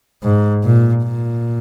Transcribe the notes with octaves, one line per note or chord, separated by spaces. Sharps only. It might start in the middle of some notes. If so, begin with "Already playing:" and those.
G#2
A#2
A#2